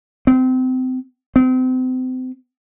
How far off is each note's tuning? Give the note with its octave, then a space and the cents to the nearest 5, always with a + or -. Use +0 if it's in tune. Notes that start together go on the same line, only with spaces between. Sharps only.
C4 -30
C4 -35